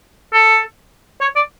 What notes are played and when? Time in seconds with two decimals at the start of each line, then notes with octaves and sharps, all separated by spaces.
0.33 A4
1.21 C#5
1.36 D5